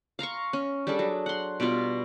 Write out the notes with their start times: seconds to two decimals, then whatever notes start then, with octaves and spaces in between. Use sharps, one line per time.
0.19 F5 A#5 C6 C#6
0.53 C#4
0.87 G3 D4 G#4 A4
0.99 F#3
1.26 F#5 C6
1.60 B2 G3 B3 F4